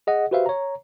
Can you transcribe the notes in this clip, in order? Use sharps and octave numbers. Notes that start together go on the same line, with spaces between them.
G#4 D#5 F#5
F#4 G4 B4 C5 E5 F5
C#5 A#5